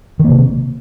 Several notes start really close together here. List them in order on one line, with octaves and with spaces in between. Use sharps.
D#3 A#3 C3